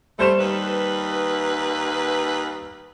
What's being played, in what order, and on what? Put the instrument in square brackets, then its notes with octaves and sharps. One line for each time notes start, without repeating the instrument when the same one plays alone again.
[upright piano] G3 C5 E7 [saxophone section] A3
[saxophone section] D#2 B4